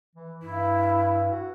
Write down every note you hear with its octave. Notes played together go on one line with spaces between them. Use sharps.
E3
G2 E4
F#4